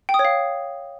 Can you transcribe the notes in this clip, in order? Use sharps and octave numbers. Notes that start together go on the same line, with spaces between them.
G5
D#6
C#5
F5